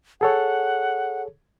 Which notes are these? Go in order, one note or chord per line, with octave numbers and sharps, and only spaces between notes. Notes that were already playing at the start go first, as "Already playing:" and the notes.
G#4 A4 C#5 F#5